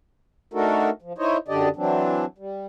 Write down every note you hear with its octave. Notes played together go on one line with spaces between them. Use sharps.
A3 D4 D#4 F#4 A4 A#4
F3
D#4 E4 C5 C#5 D#5
F#2 D3 D4 G4 D5 D#5
E3 F#3 C4 D4
G3